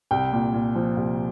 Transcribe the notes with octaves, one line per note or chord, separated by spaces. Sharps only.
C2 G5
A#2
A#2
F3
C2